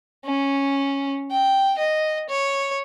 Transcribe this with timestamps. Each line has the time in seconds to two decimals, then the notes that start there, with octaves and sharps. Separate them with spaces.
0.25 C#4
1.31 G5
1.78 D#5
2.29 C#5